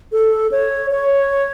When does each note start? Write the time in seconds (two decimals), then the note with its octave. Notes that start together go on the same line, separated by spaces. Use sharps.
0.12 A4
0.52 C#5
0.91 C#5